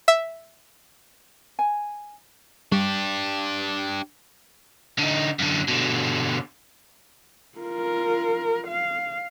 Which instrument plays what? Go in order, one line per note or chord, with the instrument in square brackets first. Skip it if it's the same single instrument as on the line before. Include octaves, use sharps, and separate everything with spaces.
[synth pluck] E5
[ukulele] G#5
[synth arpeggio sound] G3 [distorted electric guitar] D4 G4
[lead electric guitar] D3 D#4
F#2 D3
B2 D3
[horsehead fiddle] F4 A#4
F5